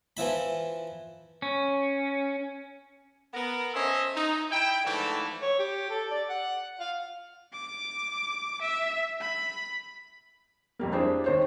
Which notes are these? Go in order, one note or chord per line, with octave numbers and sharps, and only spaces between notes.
E3 F3 E4 B5
C#4
B3 A#4
C#4 A4 C5 D#5 E5
D#4
E4 G5
G#2 D3 E3 F3 A3
C#5
G4
A4
D5
F#5
F5
D6
E5
B5
F2 G3 A#3
C4 D4 E4 G4 G#4 C5
D#2 C5 C#5